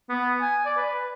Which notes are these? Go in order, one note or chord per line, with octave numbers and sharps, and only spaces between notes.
B3
G#5
D5
B4